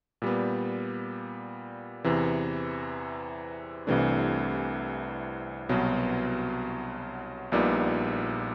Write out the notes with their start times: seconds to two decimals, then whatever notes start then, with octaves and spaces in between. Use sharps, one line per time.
0.22 A#2 G3 B3
2.04 E2 C3 E3
3.87 C2 C3 E3 A3 D4
5.69 C2 B2 F#3 B3
7.52 A#1 A#2 G3 B3 D#4